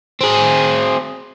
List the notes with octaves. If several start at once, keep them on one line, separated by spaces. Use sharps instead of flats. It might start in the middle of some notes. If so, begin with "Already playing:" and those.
C4 G#4